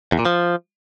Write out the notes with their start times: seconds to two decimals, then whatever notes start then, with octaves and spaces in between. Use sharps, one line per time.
0.12 E2
0.19 A#2
0.25 F3